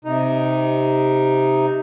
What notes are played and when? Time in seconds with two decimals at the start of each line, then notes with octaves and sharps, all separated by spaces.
0.05 C3 D#4